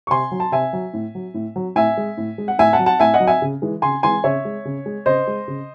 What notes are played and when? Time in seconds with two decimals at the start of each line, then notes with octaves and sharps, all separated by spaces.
0.07 C#6
0.10 C3 G#5 C6
0.32 F#3
0.40 A5
0.52 C3 E5 G#5
0.73 F#3
0.94 A2
1.15 F#3
1.34 A2
1.56 F#3
1.76 A2 E5 G#5
1.97 G#3
2.17 A2
2.38 G#3
2.48 F#5
2.59 A2 E5 G#5
2.73 F#5 A5
2.79 F#3
2.86 F#5 A5
3.00 A2 E5 G#5
3.14 D#5 F#5
3.20 F#3
3.27 E5 G#5
3.42 C#3
3.62 E3 G#3
3.82 C#3 G#5 C6
4.03 E3 G#3 G#5 C6
4.24 C#3 C#5 E5
4.45 G#3
4.65 C#3
4.86 G#3
5.06 C#3 C5 D#5
5.27 G#3
5.48 C#3